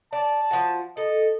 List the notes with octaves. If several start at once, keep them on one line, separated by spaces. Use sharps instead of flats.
D5 A5
F3 F#4
A4 D#5